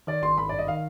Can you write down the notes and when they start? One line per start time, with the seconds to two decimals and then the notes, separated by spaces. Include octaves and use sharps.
0.07 D#3 D5
0.22 G#1 C6
0.38 G#1 B5
0.49 G2 D5
0.59 D#5
0.67 D#3 F5